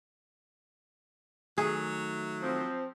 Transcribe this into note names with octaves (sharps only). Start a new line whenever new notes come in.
D#3 F#3 A3 G#4
F3 C4